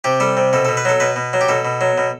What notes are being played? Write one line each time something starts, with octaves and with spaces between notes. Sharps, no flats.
C3 G4
G3 A4
C3
B2 A4
B2 A4
B4
F#3 A4
B2 B4
B2
F#3
G4
B2 A4
B2
F#3
B2